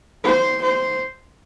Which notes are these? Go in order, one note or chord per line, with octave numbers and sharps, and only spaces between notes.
C5
C5